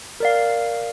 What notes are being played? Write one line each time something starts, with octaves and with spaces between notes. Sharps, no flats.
A#4 D5 F5